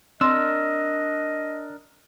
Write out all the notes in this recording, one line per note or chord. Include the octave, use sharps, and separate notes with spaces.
C4 D4 A#4 D#5 C6 E6